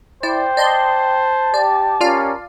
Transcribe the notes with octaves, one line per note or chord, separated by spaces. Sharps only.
E4 C5 D5 G5
D5 D#5 A5 C6
G4 D5
C#4 F4 G4 A#4 D5 F5